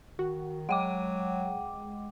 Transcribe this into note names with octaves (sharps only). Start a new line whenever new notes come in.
D#3 F#4
F#3 G#3 F#5 G5 D6